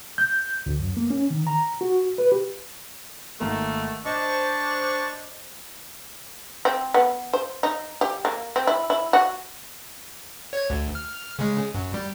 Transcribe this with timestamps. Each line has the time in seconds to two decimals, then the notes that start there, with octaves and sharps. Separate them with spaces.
0.18 G6
0.66 D2
0.79 F#2
0.97 A#3
1.10 C#4
1.30 D#3
1.47 A#5
1.81 F#4
2.18 B4
2.32 G4
3.40 G#1 A3 A#3 A#4
4.05 D4 C5 D#5 A5 C#6
6.65 C4
6.94 B3
7.33 C5
7.63 D#4
8.01 G4
8.25 A#3
8.56 C4
8.67 E4
8.90 E4
9.13 F#4
10.53 C#5 G#6
10.70 D2
10.95 F6
11.39 C#3 G#3
11.74 F#2
11.94 G3